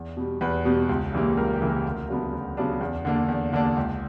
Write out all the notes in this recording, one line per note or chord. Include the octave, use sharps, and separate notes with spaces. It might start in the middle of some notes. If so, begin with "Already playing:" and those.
Already playing: E2
B2 G3
E2 B4
B2 G3
C#2
C#3 E3 G3 A#3
C#2 A#4
G4
C#3 E3 G3 A#3
A#4
D2
C#3 F#3 B3 D4
D2
C#3 F#3 B3 D4
E2
D3 A#3 D4
E2
D3 A#3 D4
C#2